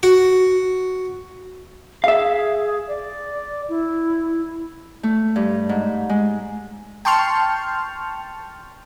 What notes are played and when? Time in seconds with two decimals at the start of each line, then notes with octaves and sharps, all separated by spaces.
0.03 F#4
2.04 G#4 E5 F5
2.88 D5
3.69 E4
5.03 A3
5.36 G2
5.69 G#2
6.09 G#3
7.05 G5 A5 C6 C#6 F6